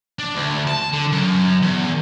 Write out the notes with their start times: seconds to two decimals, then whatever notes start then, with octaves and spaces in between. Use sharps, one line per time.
0.19 D4
0.34 D2
0.67 A5
0.92 D3
1.12 F#2
1.62 E2